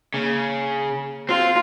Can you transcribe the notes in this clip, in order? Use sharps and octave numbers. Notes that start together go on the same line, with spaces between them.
C#3 A#3
C4 F4